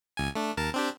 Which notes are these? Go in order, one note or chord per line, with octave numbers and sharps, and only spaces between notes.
C#2 G#5
A3 D4
D#2 A#4 A5
C4 D4 G4